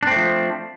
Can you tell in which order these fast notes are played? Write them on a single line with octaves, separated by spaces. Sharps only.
D4 C4 A3 F3